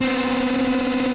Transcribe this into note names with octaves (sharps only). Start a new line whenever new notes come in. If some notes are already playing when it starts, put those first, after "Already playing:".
B3 C4